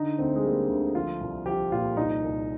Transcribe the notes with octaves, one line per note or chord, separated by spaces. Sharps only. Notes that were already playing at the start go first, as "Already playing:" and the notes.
Already playing: D3 D#4
D2 C4
G#3
G3 A#3
D2
F3 F4
C2
F3 G4
A#2 F4
C2 D#4
C2